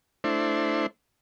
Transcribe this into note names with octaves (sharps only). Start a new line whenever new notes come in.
A3 D4 E4 C5